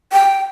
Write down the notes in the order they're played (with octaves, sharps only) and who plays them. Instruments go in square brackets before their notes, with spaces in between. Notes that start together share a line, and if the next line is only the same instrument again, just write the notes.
[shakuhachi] G5